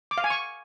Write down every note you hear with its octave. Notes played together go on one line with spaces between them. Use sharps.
D6
F5
G#5
C#6